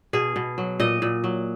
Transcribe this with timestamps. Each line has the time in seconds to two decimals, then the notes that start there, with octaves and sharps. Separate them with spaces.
0.13 B2 G#4
0.36 B2
0.58 F#3
0.80 A#2 D#5
1.02 A#2
1.24 F#3